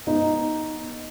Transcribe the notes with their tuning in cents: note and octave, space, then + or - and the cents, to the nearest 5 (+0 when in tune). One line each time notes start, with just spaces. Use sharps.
B3 -30 D#4 +0